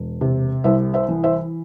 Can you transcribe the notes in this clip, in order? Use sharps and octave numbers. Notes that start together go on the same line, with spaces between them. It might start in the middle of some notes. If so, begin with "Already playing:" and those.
Already playing: E1
C3
C2 C5 E5
C5 E5
E3
C5 E5